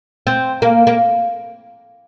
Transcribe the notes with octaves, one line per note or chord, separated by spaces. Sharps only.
C4
A#3
A#3